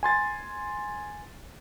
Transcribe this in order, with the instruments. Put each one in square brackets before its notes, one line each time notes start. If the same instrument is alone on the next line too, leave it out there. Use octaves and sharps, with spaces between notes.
[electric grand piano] G#5 C6 A6